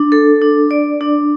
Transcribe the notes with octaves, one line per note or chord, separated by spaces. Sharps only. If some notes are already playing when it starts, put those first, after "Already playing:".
Already playing: D4
A4
D4
D5
D4